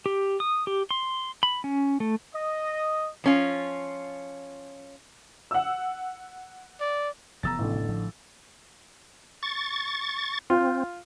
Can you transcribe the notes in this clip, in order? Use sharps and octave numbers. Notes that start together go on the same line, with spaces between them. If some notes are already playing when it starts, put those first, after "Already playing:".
G4
D#6
G4
C6
B5
C#4
A3
D#5
F3 C#4 F4
F#5 E6
D5
F1 E3 B3 A#5 E6 A6
A1 D3
F3 A3
C#6 A6
C4 F4